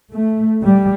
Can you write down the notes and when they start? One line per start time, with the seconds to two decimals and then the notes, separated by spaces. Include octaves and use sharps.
0.12 A3
0.64 G3